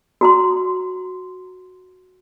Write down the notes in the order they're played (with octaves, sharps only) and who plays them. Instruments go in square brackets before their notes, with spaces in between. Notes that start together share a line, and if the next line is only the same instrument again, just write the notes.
[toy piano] F#4 A#5 C6